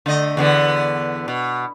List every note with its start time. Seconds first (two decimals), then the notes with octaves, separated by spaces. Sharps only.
0.06 D3 A3 D#5
0.37 E2 D3 B3
1.28 B2